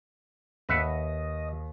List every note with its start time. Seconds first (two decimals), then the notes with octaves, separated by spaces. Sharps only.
0.69 D#2 B4 D#5 E5 F#5